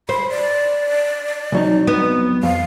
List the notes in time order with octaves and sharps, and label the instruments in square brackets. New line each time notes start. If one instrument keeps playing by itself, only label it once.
[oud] C5 [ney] B5
[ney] D5
[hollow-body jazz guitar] C2 F#3 D#4
[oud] B3
[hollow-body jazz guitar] F2 [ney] F5